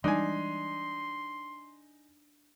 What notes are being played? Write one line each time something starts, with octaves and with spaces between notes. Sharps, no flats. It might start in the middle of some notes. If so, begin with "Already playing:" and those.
E3 G3 G#3 D4 D#4 G#5 C6